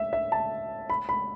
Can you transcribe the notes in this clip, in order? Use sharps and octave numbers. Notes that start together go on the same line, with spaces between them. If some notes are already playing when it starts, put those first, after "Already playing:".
Already playing: E5
E5
A5
B5
B5